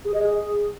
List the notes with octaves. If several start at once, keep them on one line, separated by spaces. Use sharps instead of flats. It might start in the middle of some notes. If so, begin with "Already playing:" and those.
G#4
D#5
G#4